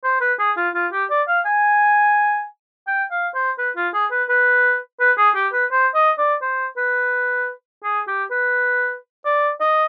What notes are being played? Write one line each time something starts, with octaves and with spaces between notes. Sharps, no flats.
C5
B4
G#4
F4
F4
G4
D5
F5
G#5
G5
F5
C5
B4
F4
G#4
B4
B4
B4
G#4
G4
B4
C5
D#5
D5
C5
B4
G#4
G4
B4
D5
D#5